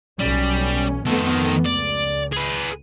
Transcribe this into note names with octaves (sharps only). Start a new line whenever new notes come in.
B1 G3 C#4
F2 D#3 A3 B3 A4
C#2 D5
G#4 B4